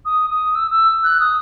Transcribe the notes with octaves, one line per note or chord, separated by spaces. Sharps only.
D#6
D#6
E6
E6
F#6
D#6